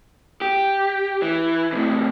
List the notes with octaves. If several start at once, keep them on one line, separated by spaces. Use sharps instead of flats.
G4
E3
A2 C3